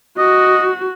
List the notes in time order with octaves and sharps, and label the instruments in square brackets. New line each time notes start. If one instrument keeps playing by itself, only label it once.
[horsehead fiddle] F#4 [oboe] D#5